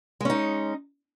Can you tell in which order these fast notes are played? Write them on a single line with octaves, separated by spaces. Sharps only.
G#3 C#4 D#4